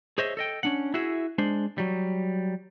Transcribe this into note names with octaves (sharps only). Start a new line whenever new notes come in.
G#4 C5 C#5 D#5 E5
A4 D#5 G5
C#4 D4 F#5
E4 F#4 G#4 E5
G#3 D4 C5
F#3 G3